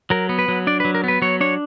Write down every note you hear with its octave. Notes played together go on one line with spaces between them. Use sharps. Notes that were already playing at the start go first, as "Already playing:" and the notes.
F#3 A#4
B3
B4
F#3
D4 D5
F#3 B4
A#4
B3 B4
F#3 C#5
D4 C#5